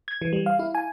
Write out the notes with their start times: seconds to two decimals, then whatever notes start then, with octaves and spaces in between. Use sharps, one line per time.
0.08 G#6
0.22 E3
0.33 G3
0.46 F5
0.59 E4
0.75 G#5